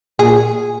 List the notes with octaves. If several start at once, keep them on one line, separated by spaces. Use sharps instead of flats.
A#2 G#4